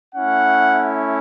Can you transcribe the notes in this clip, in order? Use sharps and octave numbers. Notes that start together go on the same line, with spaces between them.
A3 C#4 E4 F#5